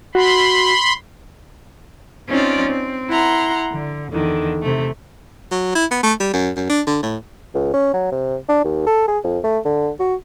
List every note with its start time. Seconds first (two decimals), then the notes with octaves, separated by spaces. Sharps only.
0.15 F#4 B5 C6
2.29 C4 C#4 D#4 F4 D5
2.67 C4
3.09 E4 F#5 A#5 C6
3.71 D3
4.12 E2 D3 D#3
4.61 C3 A3
5.51 F#3
5.75 E4
5.91 B3
6.03 A3
6.20 G3
6.33 F#2
6.56 F#2
6.70 D4
6.87 D3
7.03 A2
7.54 C#2
7.74 C#4
7.93 F#3
8.12 C3
8.49 D4
8.65 D#2
8.86 A4
9.08 G#4
9.24 F2
9.44 A3
9.65 D3
10.00 F#4